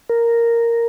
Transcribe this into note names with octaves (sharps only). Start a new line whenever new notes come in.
A#4